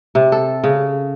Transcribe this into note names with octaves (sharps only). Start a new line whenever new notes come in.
C3
A4
C#3